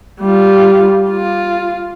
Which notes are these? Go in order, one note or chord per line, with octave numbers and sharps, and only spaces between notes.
G3 F4
F4